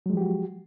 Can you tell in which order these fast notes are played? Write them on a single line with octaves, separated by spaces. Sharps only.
F#3 G#3 F3 G4 F#4